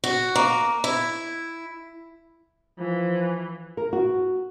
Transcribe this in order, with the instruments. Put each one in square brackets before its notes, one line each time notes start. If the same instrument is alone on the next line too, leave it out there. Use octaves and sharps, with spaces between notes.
[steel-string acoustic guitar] F#4
A#3
E4
[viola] E3 [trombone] F3
[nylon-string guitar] A#4
F#4